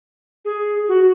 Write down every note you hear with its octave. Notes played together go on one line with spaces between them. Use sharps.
G#4
F#4